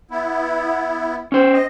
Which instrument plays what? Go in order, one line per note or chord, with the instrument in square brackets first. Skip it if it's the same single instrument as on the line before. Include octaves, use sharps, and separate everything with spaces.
[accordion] B3 E4
[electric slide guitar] C#4 C5
[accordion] D#5